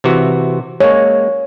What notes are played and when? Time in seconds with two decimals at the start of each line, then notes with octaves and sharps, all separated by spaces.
0.04 C3 E3 F#4
0.80 G#3 A#3 C#5